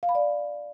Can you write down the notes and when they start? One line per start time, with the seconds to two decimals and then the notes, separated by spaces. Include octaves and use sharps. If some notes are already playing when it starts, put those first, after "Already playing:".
0.03 F5
0.09 B5
0.15 D5